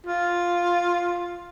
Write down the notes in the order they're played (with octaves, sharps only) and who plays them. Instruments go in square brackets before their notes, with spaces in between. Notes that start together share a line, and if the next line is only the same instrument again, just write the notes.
[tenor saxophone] F4